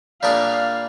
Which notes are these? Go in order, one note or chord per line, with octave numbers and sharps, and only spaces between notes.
A#2 G3 D4 G#4 F5